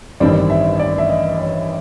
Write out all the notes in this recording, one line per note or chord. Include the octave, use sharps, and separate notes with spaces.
A1 G2 D#3 G3 C4 D5
E5
D5
E5
D#5
C#5